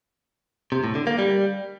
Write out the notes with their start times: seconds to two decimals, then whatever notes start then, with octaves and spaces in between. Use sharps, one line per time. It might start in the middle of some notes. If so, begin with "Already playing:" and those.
0.72 C3
0.84 A2
0.95 D3
1.07 A#3
1.18 G3